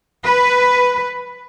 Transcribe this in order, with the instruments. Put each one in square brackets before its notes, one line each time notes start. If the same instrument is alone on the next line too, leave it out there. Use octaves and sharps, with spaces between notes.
[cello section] B4